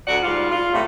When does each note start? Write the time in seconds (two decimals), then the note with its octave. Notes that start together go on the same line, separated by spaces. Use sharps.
0.07 D2 F#4 D5 F#5
0.23 G#2 G3 F4
0.49 F4
0.72 A2 C3 G3 A3